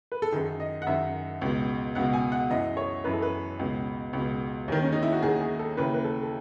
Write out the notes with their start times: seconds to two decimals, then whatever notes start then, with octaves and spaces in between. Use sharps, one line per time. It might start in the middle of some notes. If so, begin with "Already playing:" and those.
0.12 B4
0.22 A4
0.32 F#2 D#3 G#4
0.60 D#5
0.82 F#5
0.87 F#2 D#3 E5
1.41 C#2 B2
1.95 C#2 B2 F#5
2.13 G#5
2.32 F#5
2.50 F#2 E3 D#5
2.77 C#5
3.04 F#2 E3 B4
3.14 A4
3.22 B4
3.59 C#2 B2
4.13 C#2 B2
4.68 D#2 D#3
4.82 C#4
4.92 D#4
5.03 E4
5.12 F#4
5.22 D#2 D#3 G#4
5.41 G#4
5.59 A4
5.77 D#2 C#3 E3 B4
5.94 B4
6.04 A4
6.23 A4